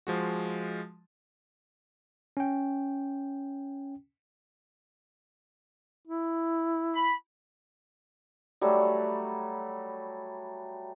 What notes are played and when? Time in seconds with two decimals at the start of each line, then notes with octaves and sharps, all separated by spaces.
0.07 F3 G#3 F#4
2.37 C#4 G5
6.07 E4
6.95 B5
8.61 F#3 G3 A3